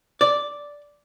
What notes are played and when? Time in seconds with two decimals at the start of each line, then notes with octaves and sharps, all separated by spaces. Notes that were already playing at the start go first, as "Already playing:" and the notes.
0.21 D5